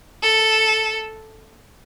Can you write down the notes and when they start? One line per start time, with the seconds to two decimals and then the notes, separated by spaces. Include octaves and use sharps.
0.23 A4